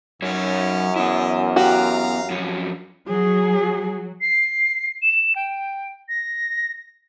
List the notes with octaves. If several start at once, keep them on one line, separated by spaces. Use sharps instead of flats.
F#2 F#3 C#4 D#4 C#5
B3 E4 D#5
F#4 G4 F5 A#5
F2 F#3 C#4
F#3 G#4
C7
E7
G5
A#6